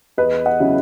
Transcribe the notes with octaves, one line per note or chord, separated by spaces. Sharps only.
E2 B4 D#5
D#5 F#5
C#3 F#3 C#4 E4